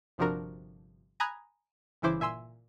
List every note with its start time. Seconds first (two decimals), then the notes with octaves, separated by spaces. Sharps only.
0.18 G1 C3 F3 D4 F#4 A#4
1.20 G#5 A#5 B5 D#6 F#6 G#6
2.02 G1 C#3 E3 E4 C5 D6
2.20 A#2 E5 G#5 C6 E6